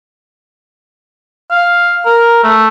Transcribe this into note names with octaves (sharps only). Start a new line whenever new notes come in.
F5
A#4
A3